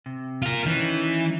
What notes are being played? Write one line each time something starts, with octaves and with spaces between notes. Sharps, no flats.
C3
F4 A#4
D#3 E3 C#4 D#4